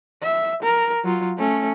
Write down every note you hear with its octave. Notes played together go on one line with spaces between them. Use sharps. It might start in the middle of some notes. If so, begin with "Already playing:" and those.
E5
A#4
F#3 F4
A3 C#4